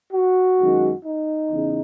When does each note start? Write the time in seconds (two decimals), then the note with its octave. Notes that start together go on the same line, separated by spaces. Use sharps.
0.13 F#4
0.59 F#2 D#3 G#3
1.05 D#4
1.51 E2 C#3